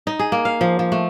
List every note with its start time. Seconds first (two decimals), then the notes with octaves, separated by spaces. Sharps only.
0.07 D#4
0.19 G#4
0.32 A#3
0.45 F5
0.61 F3
0.79 F3
0.92 A3